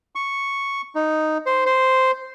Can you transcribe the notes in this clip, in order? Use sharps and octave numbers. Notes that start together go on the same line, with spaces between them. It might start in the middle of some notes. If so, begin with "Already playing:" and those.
C#6
D#4
C5
C5